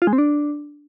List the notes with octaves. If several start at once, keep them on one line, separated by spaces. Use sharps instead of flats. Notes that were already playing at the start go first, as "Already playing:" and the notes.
F4
G#3
C4
D4